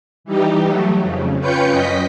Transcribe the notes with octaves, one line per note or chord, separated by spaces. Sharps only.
E3 G3 D#4 G4
F#3 A3
F2 C#3
C#4 F4 B4 G5 G6 C#7
F#2 D#5 B6